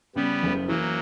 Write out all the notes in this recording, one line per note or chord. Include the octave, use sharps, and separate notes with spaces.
C#3 G3 B3
F#1
E3 F#3 A#3